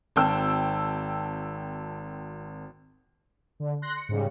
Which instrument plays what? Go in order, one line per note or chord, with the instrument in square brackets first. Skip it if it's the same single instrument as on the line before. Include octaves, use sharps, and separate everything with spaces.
[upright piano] G#1 C4 G5 A5 E6
[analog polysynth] D3
C6 F#6 A#6
C#7
G#2 C#3 G3